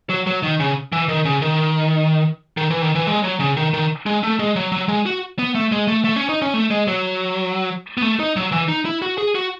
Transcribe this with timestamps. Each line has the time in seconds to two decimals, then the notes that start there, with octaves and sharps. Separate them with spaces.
0.10 F#3
0.27 F#3
0.43 D#3
0.60 C#3
0.92 E3
1.09 D#3
1.25 C#3
1.42 D#3
2.57 D#3
2.71 E3
2.82 D#3
2.95 E3
3.07 G#3
3.24 F#3
3.40 C#3
3.57 D#3
3.74 D#3
4.06 G#3
4.23 A3
4.39 G#3
4.56 F#3
4.72 F#3
4.88 G#3
5.06 F#4
5.39 B3
5.55 A3
5.72 G#3
5.88 A3
6.04 A3
6.16 C#4
6.29 D#4
6.42 C#4
6.54 A3
6.71 G#3
6.88 F#3
7.97 B3
8.02 A3
8.19 D#4
8.36 F#3
8.52 E3
8.69 D#4
8.85 E4
9.02 F#4
9.18 G#4
9.35 F#4